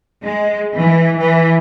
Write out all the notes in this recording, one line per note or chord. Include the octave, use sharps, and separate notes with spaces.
G#3
E3
E3